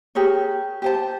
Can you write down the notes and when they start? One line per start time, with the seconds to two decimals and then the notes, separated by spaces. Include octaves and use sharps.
0.15 G4 G#4 A#4 C#5
0.82 G4 C5 A5